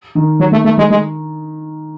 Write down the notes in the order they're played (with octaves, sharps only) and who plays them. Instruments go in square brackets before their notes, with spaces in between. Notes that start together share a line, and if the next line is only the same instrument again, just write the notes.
[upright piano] D#3
[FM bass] F#3
A3
A3
G#3
G#3